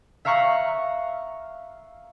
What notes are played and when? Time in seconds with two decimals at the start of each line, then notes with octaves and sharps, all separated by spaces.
0.25 E5 F5 A#5 C#6 F6 F#6